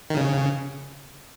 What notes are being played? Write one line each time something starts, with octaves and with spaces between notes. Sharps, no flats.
D#3
C#3